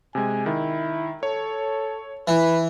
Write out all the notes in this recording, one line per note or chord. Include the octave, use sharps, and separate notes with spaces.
C3 G#3 G#5
D#3 E4
A4 C#5
E3 B4